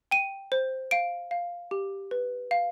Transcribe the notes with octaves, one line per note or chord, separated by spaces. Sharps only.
G5 D#7
C5
F5 D7
F5
G4
B4
F5